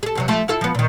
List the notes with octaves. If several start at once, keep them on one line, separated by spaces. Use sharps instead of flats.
G#4 A4
E2 C3 F#3
F3 A3
E4 F4 A4
F3 B3
A#2 D#3